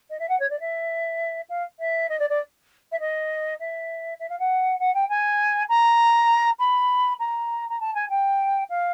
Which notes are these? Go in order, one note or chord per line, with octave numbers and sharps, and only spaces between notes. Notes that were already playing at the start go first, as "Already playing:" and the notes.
D#5
E5
F#5
C#5
D5
E5
F5
E5
D#5
D5
D5
E5
D#5
E5
E5
F5
F#5
F#5
G5
G#5
A#5
B5
A#5
A#5
A5
G#5
G5
F5